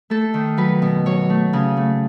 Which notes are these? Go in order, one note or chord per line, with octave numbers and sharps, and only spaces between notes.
A3 A4
D#3
F#3 B4
B2
F#3 C#5
A3
C#3
A3